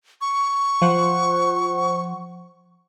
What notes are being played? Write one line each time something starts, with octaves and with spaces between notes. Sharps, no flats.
C#6
F3 C5 F#5